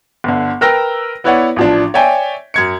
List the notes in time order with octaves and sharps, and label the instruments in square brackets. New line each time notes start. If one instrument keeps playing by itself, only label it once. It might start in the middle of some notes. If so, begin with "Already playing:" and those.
[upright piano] G1 D3
A#4 B4 G5 E6 F6 A#6
B3 E4 B4 C#5 D5 F#5
A1 F3 D4
C#5 D5 E5 G5 G#5
F#2 G#6 C#7